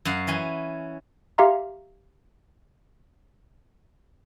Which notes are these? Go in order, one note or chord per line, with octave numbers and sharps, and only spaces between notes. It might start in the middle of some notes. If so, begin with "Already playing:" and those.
F#2 F5 F#5
E3 C#4 G#5
G4 E5 F5 A#5 C6